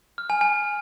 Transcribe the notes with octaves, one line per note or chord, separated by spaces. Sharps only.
F6
G#5
G#5